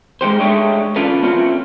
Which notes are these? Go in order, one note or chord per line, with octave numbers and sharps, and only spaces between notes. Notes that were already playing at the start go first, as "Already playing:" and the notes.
G#3 D#4 G4 C5
G#3 A3 D4 G4 C#5 D#5
D3 C#4 D4 F4 A4 B4
A3 C4 C#4 F4 F#4